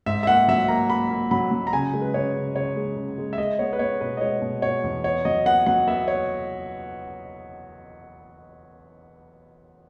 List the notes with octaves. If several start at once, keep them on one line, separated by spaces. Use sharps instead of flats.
G#2 E5
E5
A#3 F#5
F#3 E5
A#3 A#5
A#3 B5
A#3
F#3 B5
F#3
A#5
C#3 G#5
G#3
B4
C#3 C#5
C#3
C#3 C#5
G#3
C#3
G#3
E5
G#3 D#5
B3 C#5
B4
B3 C#5
B2 B4
D#5
G#3 C#5
B2
B2 C#5
E2
B3 C#5
F#3 D#5
B3 F#5
F#3 F#5
B3 E5
C#5